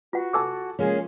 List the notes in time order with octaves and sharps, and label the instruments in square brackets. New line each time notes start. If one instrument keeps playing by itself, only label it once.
[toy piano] F4 F#5 [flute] F#4
[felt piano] A4 G#5 A5 [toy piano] D6 E6
[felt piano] F3 [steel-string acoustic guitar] G#3 A#3 C#4 [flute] G#4